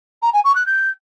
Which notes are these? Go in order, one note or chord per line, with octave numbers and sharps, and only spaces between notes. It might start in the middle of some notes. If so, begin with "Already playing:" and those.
A#5
G#5
C#6
F#6
G6